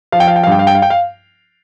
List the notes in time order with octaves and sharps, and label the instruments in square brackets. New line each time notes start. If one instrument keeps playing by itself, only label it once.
[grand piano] F3 F5
G5
F5
G5
F5
G2 G5
F5
G5
F5
G5
F5